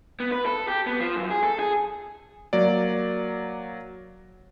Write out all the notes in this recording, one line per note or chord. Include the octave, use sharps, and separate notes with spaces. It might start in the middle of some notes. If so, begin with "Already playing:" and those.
B3
B4
A4
G4
B3
F3
F#2
G#4
A4
G#4
F#3 A#3 D5